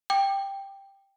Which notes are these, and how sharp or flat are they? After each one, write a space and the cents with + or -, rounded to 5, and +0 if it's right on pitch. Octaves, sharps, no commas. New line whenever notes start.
G5 +5 D6 +30